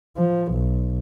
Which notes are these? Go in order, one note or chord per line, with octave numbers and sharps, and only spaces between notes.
F3
B1